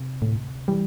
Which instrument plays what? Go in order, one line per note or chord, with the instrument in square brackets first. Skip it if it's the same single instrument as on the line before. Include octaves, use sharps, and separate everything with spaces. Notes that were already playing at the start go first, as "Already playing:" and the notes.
Already playing: [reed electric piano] C3
[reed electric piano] D2 [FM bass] A2
[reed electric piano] E3 [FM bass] G3